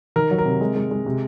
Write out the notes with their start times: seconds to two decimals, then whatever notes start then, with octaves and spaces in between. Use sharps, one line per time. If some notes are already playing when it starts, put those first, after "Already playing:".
0.16 D#3 A#4
0.31 F#3
0.38 A#4
0.45 C3
0.61 G#3
0.76 G#3
0.91 G#3
1.06 C3